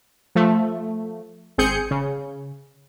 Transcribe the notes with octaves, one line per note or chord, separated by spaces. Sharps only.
F3 A3
G#1 C4 G#4 G6 C#7
C#3